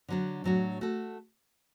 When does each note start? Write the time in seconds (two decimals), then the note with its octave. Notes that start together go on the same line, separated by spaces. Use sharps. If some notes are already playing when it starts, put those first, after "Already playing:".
0.08 D3 F#3 D4
0.44 A2 F#3 D4 F#4
0.81 A3 F#4 A4